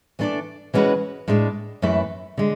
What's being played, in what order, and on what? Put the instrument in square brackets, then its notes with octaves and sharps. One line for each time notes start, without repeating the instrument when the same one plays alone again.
[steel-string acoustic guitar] E3 A3 D4 A4 D5
E3 G#3 C#4 F#4 B4
A2 G#3 D4
F#2 E3 A3 E4 B4
D3 G#3